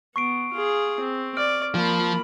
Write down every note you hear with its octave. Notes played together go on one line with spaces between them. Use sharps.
B3 C#6 C7 D7
F4 G#4
C4
D5 F6 D7
F3 A#3 B5